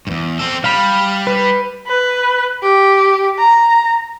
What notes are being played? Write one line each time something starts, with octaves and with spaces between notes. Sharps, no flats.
E2 G2
C4 A4
G3 F5 B5
B4
B4
G4
A#5